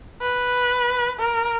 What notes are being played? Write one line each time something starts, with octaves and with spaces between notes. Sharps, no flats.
B4
A#4